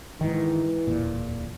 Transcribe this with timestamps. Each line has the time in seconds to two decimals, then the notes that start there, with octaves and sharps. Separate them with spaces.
0.21 G#2 D#3 E3
0.87 D1 E2 A#2